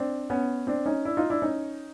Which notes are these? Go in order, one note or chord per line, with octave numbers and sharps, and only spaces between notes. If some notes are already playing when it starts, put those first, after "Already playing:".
Already playing: C4 D4
B3 C#4
C4 D4
C#4 D#4
D4 E4
D#4 F4
D4 E4
C#4 D#4